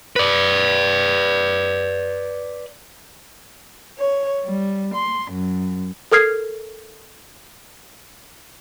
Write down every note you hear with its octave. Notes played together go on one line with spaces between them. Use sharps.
B4 D5
C#5
G3
C6
F#2
A4 A#4 D#6 F6 G#6 C7